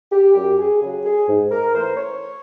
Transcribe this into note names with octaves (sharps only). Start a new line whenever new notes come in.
G4
F#2 G4
G#4
C#3 F#3 G#4
G#4
G#2
A#4
E3 A3 C5
C#5